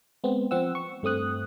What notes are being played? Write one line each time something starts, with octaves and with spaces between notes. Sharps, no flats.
G#3 B3 C4
F3 C4 F#5 E6
C#6
G2 A3 C4 D#6 F#6